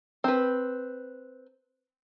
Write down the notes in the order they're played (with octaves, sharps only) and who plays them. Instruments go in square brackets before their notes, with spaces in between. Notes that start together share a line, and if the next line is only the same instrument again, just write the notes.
[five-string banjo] C4 B4